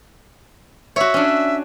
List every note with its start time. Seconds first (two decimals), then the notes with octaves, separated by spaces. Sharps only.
0.96 F#4 C#5 E5
1.14 C#4 D4